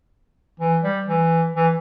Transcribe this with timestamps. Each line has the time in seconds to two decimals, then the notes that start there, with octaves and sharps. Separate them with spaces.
0.60 E3
0.83 G3
1.08 E3
1.56 E3